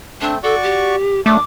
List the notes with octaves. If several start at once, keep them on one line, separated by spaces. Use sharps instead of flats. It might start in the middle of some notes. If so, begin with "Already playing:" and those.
A3 C4 D4
F#4 A4 D5 C#6
G4
F#2 A3 D4 D6